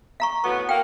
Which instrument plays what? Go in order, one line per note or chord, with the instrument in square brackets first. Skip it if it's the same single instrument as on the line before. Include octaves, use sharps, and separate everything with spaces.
[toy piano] F5 A#5 C#6
[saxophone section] A2 F#3 B3 [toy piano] C#6
[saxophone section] A#3 [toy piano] G5